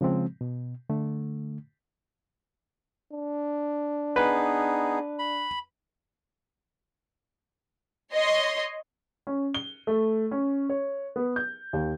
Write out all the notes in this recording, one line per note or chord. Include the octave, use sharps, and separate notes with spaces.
C#3 F3 G#3 C4
B2
D3 A3
D4
B3 D#4 G#4 B4
B5
C#5 D#5 C6
C#4
G7
A3
C#4
C#5
B3
G6
D#2